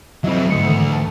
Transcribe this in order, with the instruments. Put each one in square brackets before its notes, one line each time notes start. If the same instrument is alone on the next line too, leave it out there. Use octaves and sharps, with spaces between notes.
[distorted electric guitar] F#3 C4 [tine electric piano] E4 D#5 E5
[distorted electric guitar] D2 [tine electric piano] G#2 D#6 C#7
[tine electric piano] G#2 D#3 E3
A5